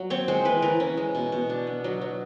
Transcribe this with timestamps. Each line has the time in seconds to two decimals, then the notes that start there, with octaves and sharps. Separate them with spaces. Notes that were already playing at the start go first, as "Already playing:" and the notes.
Already playing: F#3
0.10 C4 C#5
0.28 G#3 C5
0.45 E3 B4
0.62 E3 A#4
0.80 C#4
0.97 G#3
1.15 B2
1.32 B2
1.50 D4
1.67 B3
1.84 F#3
2.01 F#3